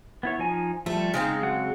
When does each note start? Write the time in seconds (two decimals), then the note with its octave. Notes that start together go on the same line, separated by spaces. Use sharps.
0.23 B3 E4 C#5
0.39 F3 D#4 G#5
0.86 F3 G3 A3 A4
1.14 C#3 G#3 C4 D#4
1.43 F#3 F#5